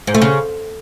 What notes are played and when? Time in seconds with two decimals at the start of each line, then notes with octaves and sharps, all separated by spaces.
0.07 G#2
0.14 A3
0.22 C#3